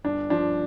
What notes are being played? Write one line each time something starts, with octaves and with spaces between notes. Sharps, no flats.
G1 D4
F3 D4